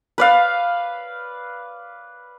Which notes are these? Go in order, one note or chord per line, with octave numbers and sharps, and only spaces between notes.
B4 D5 F5